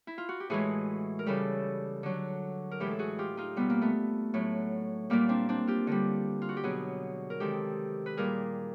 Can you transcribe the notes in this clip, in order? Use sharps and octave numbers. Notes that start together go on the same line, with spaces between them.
E4
F4
F#4
G4
A2 E3 G#3 F#4 G#4
A#4
C#3 E3 G3 G4 A4
D3 F#3
A#4
A2 E3 G#3 G4 A4
A4
F#4 G#4
F4 G4
D#4 F4
B2 G3 B3
A#3
A3 B3
A2 F#3
A#2 G3 A#3
C4 D4
C4 D4
F4 G4
D3 G3
F4
F#4
G4
B2 F#3 F#4 G#4
A#4
C3 D#3 G#3 G4 A4
B4
A#2 G3 G#4 A#4